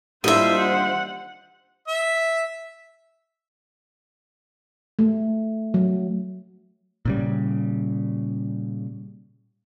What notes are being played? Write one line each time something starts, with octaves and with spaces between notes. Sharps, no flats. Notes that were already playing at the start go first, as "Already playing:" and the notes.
G3 A#3 D4 E4 F4 C5 D#5 E5
F#5
E5
A3
F#3
A#2 C#3 G3